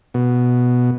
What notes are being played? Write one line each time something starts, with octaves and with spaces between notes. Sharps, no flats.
B2